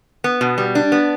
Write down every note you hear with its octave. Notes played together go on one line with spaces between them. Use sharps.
B3
B2
G3
D4
B3